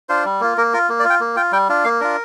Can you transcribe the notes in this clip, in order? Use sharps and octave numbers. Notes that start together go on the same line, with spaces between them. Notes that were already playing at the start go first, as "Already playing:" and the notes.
D4 F4 C5
G3
A#3 F4
A#3 A#4
F4 A#4
A#3
D5
F4
G5
A#3
F4 G5
G3 G5
D4 F4
A#3 F5
D4 F4 A#4